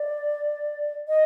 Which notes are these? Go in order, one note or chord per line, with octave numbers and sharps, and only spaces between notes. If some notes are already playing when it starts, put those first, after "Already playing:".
Already playing: D5
D#5